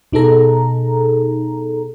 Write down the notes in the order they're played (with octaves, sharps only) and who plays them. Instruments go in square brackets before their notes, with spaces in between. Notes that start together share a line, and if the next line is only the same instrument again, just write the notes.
[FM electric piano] B2 D#4 G#4 A4 A#5